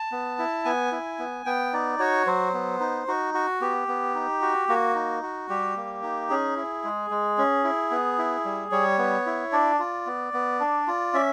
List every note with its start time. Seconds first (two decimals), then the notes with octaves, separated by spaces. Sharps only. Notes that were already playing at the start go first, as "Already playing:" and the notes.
Already playing: A5
0.12 B3
0.39 E4
0.65 B3 G#5
0.92 E4
1.19 B3
1.46 B3 G5
1.73 D#4 D5
1.99 F#4 C#5
2.27 F#3 C5
2.54 B3
2.80 D#4
3.08 D#4 F#4
3.34 F#4
3.61 B3 G4
3.88 B3
4.15 D#4
4.42 F#4
4.69 A#3 F#4
4.95 D#4
5.22 F#4
5.49 G3 G4
5.77 A#3
6.03 D#4
6.30 C#4 G#4
6.57 E4
6.84 G#3
7.10 G#3
7.38 C#4
7.64 E4
7.91 B3
8.18 E4
8.45 G3
8.72 G3 C#5
8.99 B3
9.26 E4
9.52 D4 D5
9.79 F4
10.06 B3
10.33 B3
10.60 D4
10.87 F4
11.14 C#4 E5